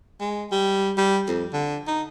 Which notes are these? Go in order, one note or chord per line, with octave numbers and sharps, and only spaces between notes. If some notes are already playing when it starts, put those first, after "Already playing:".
G#3
G3
G3
F2
D3
D#4